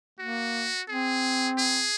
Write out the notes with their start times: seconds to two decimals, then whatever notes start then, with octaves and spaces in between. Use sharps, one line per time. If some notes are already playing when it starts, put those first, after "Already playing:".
0.19 A#3 F#4
0.88 C4 G#4
1.58 G#4